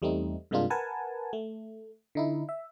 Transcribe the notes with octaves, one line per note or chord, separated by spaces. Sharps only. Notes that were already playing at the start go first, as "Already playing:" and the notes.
E2 G3 A3 C4 D#4
G2 C3 G#3 A#3 D4 F4
A#4 B4 F#5 G#5 A5
A3
D3 D#4 E4
E5